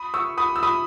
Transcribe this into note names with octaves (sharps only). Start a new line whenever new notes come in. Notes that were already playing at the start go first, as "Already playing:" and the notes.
Already playing: B5 D#6
C#6 E6
B5 D#6
E6
B5 D#6